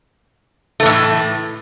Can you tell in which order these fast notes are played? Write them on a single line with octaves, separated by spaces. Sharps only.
A3 E3 A2